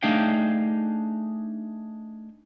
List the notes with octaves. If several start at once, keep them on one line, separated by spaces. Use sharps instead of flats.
A3 D4 D#4 G#4 F5 G5